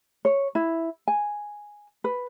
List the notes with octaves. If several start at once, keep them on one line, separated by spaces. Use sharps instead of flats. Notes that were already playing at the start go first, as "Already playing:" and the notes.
C#5
E4
G#5
B4